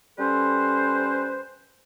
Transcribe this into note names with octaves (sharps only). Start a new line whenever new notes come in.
G3 C#4 A4 B4 C5